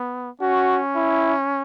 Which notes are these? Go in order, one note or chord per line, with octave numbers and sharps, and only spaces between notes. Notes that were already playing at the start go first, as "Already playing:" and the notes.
Already playing: B3
C#4 F#4
E4